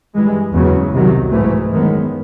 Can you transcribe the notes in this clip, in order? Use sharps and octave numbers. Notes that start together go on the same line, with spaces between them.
G2 E3 G#3
E2 C#3 F#3
C2 C3 D#3 F#3
G#2 E3 A3
F#2 D#3 G#3 B3